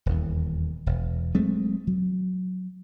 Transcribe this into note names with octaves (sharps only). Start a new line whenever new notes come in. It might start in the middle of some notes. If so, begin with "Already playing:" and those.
D#1 E2
E1
F#3 G#3 A3 C4
F#3